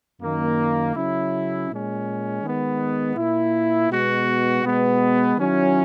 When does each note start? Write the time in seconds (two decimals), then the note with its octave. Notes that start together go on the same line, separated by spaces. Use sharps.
0.22 F#2 D#3 A#3
0.95 C#3 F#3 C#4 E4
1.70 A#2 G#3 C#4
2.43 D#3 G#3 B3
3.16 A#2 A#3 E4
3.90 B2 G#3 B3 F#4
4.64 B2 G#3 B3
5.37 D#3 F#3 C#4 E4